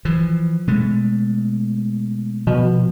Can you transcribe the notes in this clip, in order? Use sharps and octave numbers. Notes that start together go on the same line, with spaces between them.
E3 F3
B2 G#3 A3
B2 F3